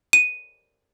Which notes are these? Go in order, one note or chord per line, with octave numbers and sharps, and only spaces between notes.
D#7